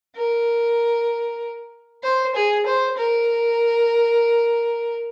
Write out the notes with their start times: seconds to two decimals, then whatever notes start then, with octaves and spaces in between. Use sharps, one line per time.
0.17 A#4
2.04 C5
2.35 G#4
2.66 C5
2.98 A#4